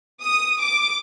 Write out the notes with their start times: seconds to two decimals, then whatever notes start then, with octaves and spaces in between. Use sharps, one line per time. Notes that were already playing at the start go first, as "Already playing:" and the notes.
0.21 D#6
0.60 D6